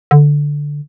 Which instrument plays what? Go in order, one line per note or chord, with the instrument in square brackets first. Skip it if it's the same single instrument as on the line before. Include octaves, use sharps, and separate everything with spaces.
[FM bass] D3